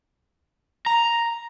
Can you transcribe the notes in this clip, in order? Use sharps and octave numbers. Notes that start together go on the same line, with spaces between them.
A#5